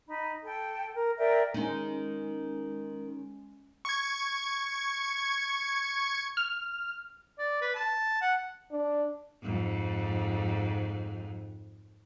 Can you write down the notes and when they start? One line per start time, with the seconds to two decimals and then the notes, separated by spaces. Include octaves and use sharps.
0.09 D#4 B5
0.45 A4 G5
0.94 A#4
1.18 A#4 D5 E5 G5
1.54 D#3 G#3 C#4 D#4
3.85 C#6 G#6
6.37 F6
7.39 D5
7.61 B4
7.75 A5
8.21 F#5
8.71 D4
9.42 F2 G#2